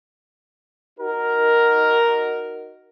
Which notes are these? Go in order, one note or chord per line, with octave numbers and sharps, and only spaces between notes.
D#4 F#4 A#4